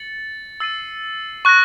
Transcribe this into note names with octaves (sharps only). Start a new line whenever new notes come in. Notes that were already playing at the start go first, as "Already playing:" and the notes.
Already playing: A6 C#7 F#7
E6 A6 C7 D#7
C#6 F#6 A#6